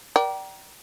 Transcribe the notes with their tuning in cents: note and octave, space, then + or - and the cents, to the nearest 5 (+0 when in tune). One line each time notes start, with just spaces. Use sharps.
A#4 +30 D5 +0 G5 -30